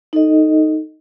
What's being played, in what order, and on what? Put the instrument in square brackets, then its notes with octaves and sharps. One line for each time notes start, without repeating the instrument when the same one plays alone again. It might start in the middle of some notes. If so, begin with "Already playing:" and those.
[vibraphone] D#4 A4 D#5